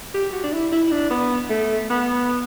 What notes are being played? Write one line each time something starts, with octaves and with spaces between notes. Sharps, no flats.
G4
F#4
D4
E4
E4
E4
D4
B3
A3
B3